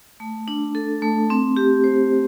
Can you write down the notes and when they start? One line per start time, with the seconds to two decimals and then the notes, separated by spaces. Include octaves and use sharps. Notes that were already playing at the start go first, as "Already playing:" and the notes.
0.20 A3
0.48 D4
0.75 A4
1.02 A3
1.30 C4
1.57 G4
1.84 C5